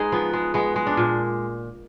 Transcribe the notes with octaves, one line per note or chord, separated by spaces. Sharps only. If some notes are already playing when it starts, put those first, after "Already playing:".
Already playing: G#3 D#4 G#4 B4
F3 B3
G#3
G#3 B3
G#3
D4
A#2